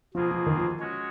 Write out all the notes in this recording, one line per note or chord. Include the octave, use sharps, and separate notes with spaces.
B2 F3 A#3 F4 G#4
F3
D#3
F3
G#3 C#4 F#4 C#5